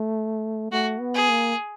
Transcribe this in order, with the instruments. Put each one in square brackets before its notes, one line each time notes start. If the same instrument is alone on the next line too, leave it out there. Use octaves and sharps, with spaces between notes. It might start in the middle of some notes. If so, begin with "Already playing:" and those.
Already playing: [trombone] A3
[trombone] A3 [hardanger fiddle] F#4
[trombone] B3
[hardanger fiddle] G#4
[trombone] A#3